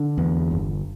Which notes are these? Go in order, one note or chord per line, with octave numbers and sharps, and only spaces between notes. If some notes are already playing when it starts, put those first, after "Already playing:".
Already playing: D3
E2
G1